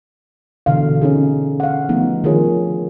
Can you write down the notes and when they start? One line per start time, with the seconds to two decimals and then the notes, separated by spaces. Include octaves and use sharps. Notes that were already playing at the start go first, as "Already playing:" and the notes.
0.66 B2 D3 E3 F5
1.02 C#4 D#4 G#4
1.60 F5 F#5
1.89 D#3 F3 A3 B3 D#4
2.24 D#3 F3 D4 F4 G#4 C#5